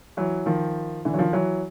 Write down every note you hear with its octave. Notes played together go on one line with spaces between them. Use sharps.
E3 F#3
D#3 F3
D3 E3
F#3
D#3 F3
E3 F#3